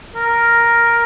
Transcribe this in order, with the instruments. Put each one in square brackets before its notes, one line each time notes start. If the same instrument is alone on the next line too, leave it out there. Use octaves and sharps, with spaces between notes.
[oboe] A#4